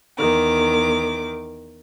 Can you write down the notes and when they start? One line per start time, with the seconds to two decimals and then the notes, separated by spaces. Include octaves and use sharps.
0.17 E2 D#3 D6